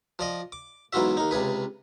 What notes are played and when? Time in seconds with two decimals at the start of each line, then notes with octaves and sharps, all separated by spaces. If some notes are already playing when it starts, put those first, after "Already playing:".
0.19 F3 D5 D#5
0.52 D6
0.93 B1 G#2 E3 F4 F#4 E5
1.17 D#2 D#4
1.31 C#2 C3 G#4 B4